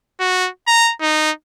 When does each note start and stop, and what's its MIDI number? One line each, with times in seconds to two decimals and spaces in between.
0.20 0.49 66
0.67 0.92 82
1.01 1.31 63